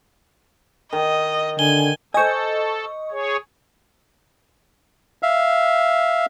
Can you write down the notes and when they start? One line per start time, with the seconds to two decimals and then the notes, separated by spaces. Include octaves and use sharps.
0.93 D#3 D#5
1.59 D3 G#5 G7
2.14 A4 C5 D#5 G#5 C#6
3.11 G#4 C#5
5.23 E5 F5